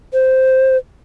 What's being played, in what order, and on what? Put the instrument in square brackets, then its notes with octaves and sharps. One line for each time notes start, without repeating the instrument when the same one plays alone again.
[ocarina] C5